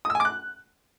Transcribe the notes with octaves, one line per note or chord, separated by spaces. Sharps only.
D#6
E6
G#5
D6
F#6